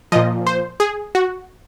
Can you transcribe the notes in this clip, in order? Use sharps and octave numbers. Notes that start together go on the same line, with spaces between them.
A#2 F3 D#5
C5
G#4
F#4